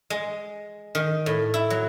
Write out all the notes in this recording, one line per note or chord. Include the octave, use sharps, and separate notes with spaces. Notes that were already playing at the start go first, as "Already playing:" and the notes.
G#3
D#3
A2
E4
F#3